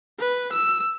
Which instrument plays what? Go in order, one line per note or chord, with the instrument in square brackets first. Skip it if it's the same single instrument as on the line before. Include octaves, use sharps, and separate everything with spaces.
[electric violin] B4
E6